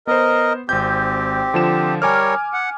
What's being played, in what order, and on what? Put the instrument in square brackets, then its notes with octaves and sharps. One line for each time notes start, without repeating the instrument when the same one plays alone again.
[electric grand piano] B3 C5 [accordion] A#4 D#5
[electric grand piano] G#1 G6 [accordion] C4 G4
[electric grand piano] D3 F3 E7
[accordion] G3 A#4 C#5 [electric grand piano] G#5 D6 F6
[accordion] F#5